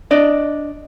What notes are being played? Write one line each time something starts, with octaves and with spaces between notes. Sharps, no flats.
D4 D5 D#5